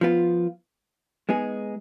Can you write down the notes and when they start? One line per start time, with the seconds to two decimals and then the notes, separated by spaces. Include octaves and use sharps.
0.01 F3 B3 F4
1.29 G#3 B3 D#4 G#4